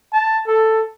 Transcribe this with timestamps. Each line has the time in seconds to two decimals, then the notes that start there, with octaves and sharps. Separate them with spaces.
0.13 A5
0.47 A4